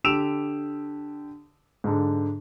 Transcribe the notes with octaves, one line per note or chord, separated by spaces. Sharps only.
D3 G4 E6 D7 E7 F7
G#2 D3